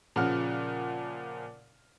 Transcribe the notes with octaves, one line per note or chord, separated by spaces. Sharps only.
A#2 C#3 F3 F#5 F6